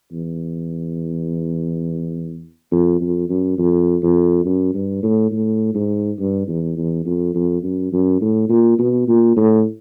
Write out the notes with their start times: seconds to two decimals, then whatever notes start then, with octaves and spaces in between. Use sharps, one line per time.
0.12 E2
2.72 F2
3.01 F2
3.29 F#2
3.58 F2
4.02 F2
4.45 F#2
4.74 G2
5.03 A2
5.31 A2
5.75 G#2
6.19 G2
6.48 E2
6.77 E2
7.05 F2
7.34 F2
7.63 F#2
7.92 F#2
8.21 A2
8.49 A#2
8.79 B2
9.08 A#2
9.36 A2